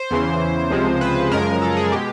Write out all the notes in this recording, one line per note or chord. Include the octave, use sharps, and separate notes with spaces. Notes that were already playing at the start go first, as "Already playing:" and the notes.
Already playing: C5
E2 C#3 E3
C#2 C3 F3 G#3
B4
F#2 C#3 F3 G#3 A#4
A4
G#4
B2 G#3 G4